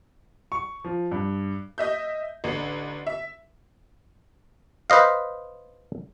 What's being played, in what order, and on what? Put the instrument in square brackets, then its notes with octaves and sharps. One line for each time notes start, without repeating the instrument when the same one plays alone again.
[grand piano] C#6
F3
G2
[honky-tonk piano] D#5 E5 G6
A1 D3
E5
[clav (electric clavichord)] B4 C5 D#5 F5